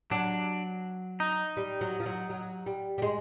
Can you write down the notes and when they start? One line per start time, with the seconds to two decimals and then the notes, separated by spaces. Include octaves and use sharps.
0.11 F#3 D4
1.20 D#4
1.57 G3
1.81 F#3
2.00 F3
2.06 F#3
2.30 F#3
2.66 G3
2.98 G3
3.02 G#3